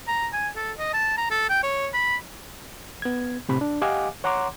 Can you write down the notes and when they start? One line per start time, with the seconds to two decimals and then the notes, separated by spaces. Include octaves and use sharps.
0.08 A#5
0.33 G#5
0.56 A4
0.79 D#5
0.94 A5
1.18 A#5
1.31 A4
1.49 G5
1.63 C#5
1.94 B5
3.02 B3 G#6
3.49 A2 C3 B5
3.61 D4
3.82 G4 D#5 F5 F#5 G#5 D6
4.24 C#5 F#5 A#5 C6 D6